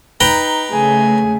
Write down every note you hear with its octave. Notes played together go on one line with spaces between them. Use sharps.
D#4 B4 G5 A#5
C#3 A3 G#4 G#5